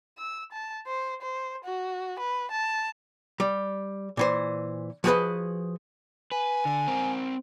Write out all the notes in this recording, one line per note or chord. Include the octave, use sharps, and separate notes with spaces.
E6
A5
C5
C5
F#4
B4
A5
G3
A#2 E3 C5
F3 F#4 G#4 A#4 B4 D#5
B4 G#5
D3
C4 A#4